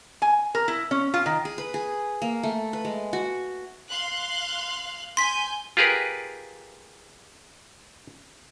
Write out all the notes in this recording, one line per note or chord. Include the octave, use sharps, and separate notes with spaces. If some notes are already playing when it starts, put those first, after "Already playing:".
G#5
A#4
E4
C#4
F4
D#3
G#4
B4
G#4
A#3
A3
B4
G#3
F#4
F5 C6 F#6
G#5 C6 G6 B6
F4 G4 G#4 A#4 B4